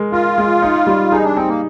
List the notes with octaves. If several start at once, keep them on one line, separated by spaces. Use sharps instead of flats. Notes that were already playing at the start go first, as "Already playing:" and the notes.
Already playing: G#3 A#4
F4 A#4
G#3
D#4
G3
D#4 G#4
D4
C4 D#4
A#3